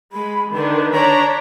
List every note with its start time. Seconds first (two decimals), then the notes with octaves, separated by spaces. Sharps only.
0.13 G#3 B5
0.53 D3 D#3 D4 B4
0.93 D4 C#5 A#5 B5